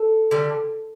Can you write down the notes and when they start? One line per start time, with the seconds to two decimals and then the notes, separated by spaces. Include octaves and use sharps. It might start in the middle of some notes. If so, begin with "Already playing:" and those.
Already playing: A4
0.31 D3 G3